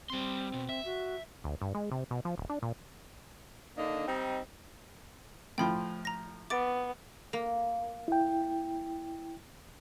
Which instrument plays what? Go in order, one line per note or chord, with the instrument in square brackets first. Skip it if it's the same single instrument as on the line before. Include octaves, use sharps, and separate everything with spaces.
[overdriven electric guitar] G3 C6 [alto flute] C4
[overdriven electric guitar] B2
E5
[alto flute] F#4
[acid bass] D2
G2
G#3
C3
B2
F3
D1
D4
A#2
[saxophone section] D3 A#3 D4 D#4
G3 C4 D#4
[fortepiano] A2 F3 [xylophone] G5 B5 C6
[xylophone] A#5 A#6
[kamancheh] B3 [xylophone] D6 A6 D7
[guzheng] A#3
[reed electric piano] E4 G5